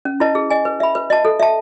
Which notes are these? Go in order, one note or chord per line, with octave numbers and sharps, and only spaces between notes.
C#4
E4 B4 D#5 A5
G#4
D#5 G#5
B4
E5 B5
B4
D#5 A5
A4
E5 A5